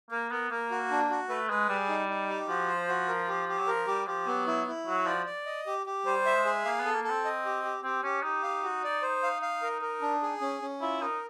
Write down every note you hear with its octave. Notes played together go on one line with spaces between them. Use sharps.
A#3 A#4
B3 A#4
A#3 A#4
F#4
D4
F#4
A3 B4
G#3 B4
G3 G#4
D#4
D#4
G4
F3 F#4
C5
F#4
A#4
G4
G4
F#3
F3 A#4
G3 G4
F3 G4
F#3 B3
F#3 E4
E4
F#3 F#4
F3 D5
D5
D#5
G4
G4
G3 C5
E5
G#3
G#4
A#3 F5
B3
A4
A#3
A4
C4
D#5
G4
G4
C4 G4
C#4 G4
D#4 G4
D#4 F5
F#4
D5
C5
F5
F5
A#4
A#4
D4
G#4
C#4
C#4
E4 F4
D#4 A#4